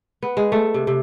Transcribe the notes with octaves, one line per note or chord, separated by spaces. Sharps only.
B3
G#3
A3
C3
C3